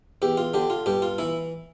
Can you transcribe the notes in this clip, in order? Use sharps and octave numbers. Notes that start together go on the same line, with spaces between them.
E2 G4
F4
D3 G4
F4
G2 G4
F4
E3 E4